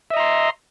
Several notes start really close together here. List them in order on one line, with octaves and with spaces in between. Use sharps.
E5 D#5 A#5 C6